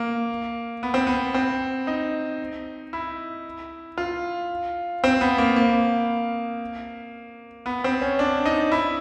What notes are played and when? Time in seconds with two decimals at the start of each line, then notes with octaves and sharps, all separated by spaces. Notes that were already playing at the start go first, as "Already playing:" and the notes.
Already playing: A#3
0.83 B3
0.94 C4
1.07 B3
1.34 C4
1.87 D#4
2.93 E4
3.98 F4
5.04 C4
5.21 B3
5.38 A#3
5.56 A#3
7.66 B3
7.84 C4
8.01 C#4
8.19 D4
8.46 D#4
8.72 E4